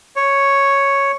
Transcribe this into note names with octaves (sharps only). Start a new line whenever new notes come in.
C#5